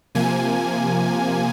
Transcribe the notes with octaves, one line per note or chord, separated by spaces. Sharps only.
C3 F3 A#3 G#5